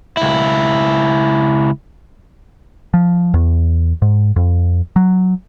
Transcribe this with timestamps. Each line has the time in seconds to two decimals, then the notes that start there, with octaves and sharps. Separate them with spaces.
0.17 C#2 E4
2.94 F3
3.34 E2
4.02 G#2
4.36 F2
4.96 F#3